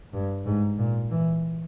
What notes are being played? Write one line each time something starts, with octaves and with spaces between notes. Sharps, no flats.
G2
G#2
A#2
E3